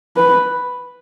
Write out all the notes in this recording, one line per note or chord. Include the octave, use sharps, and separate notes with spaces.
B4